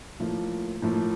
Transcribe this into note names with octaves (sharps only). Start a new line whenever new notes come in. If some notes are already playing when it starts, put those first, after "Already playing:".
A2 F3 A#3
A2 F3 A#3